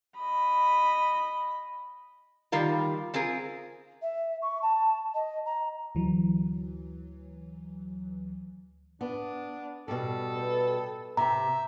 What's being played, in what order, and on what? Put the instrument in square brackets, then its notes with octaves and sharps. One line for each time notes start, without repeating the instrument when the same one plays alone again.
[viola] D#5 B5
[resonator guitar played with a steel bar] D#3 G3 F4 A#4
C4 F4 G#4 A#4
[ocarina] E5
C#6
A5
D#5
A#5
[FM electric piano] D2 E3 F#3
[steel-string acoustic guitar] B3 [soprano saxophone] D4
[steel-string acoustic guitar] B2 G3 [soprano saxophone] A4
[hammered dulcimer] B4 G5
[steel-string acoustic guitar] C3 G4 [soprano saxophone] E5 [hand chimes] A#5